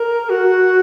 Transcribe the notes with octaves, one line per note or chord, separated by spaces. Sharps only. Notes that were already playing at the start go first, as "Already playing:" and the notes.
Already playing: A#4
F#4